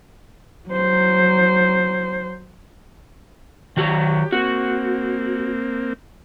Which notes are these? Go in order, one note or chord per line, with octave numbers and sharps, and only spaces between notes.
F#3 C5
D#3 F#3 F#4 G4
A#3 C4 F#4